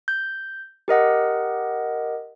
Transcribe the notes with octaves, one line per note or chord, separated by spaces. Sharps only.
G6
G4 A#4 D#5 F#5